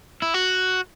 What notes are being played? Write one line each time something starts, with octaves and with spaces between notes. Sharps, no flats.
E4
F#4